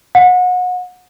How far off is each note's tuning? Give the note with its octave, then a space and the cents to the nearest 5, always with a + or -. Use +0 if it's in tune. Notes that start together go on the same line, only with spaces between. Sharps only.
F#5 -30